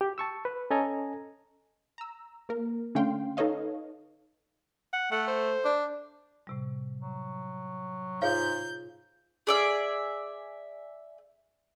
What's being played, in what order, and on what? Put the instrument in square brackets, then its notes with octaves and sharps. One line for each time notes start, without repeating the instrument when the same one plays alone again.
[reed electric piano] G4
A5 C#6 E6
B4
C#4 A4 D#5 G#5 A#5
[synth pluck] A#5 E6
A#3 A#4
D3 A3 C#4 F5 G5 C6
D#4 A4 B4 C#5 D#5 F5
[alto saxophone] F#5
[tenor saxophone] A3 [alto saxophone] F#5
[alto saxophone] C5
[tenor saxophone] D4
[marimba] A2 C3 G3
[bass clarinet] F#3
[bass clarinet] G#2 [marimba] F4 [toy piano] G#4 C#5 F5 [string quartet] G6
[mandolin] G#4 D5 E5